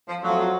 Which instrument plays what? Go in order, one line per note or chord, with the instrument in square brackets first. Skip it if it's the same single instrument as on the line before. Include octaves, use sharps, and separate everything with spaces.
[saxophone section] F3
[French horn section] F2 F3 A3 F4 [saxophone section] F#3